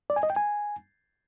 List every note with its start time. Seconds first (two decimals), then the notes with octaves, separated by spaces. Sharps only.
0.10 D5
0.16 G#5
0.23 D#5
0.30 G5
0.36 G#5